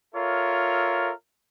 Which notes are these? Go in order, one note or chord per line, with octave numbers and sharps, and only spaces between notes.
F4 A4 A#4 C#5 E5